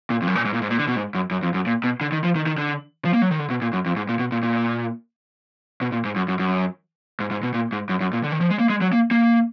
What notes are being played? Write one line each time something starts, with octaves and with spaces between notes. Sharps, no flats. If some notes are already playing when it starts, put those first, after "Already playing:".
A#2
F2
F#2
A#2
G#2
A#2
G#2
A#2
D3
B2
G#2
F#2
F#2
F2
F#2
A#2
B2
D3
D#3
F3
D#3
D#3
D3
F3
A#3
F#3
D#3
D3
B2
A#2
F#2
F2
G#2
A#2
B2
A#2
A#2
B2
A#2
G#2
F#2
F#2
F#2
G#2
G#2
B2
A#2
G#2
F#2
F#2
A#2
D3
D#3
F3
G#3
A#3
G#3
F#3
A#3
A#3